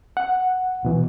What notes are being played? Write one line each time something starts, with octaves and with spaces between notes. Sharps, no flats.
F#5
D2 B2 E3